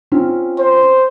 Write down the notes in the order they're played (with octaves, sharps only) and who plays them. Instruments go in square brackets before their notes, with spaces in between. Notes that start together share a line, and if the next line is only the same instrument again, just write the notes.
[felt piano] C4 C#4 F4
[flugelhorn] C5